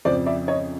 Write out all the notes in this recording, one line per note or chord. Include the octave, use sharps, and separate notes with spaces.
F2 C#3 F3 C5 D5
D5 E5
C#5 D#5